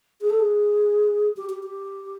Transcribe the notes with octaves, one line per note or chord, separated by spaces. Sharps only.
G#4
A4
G#4
G4
G4
G4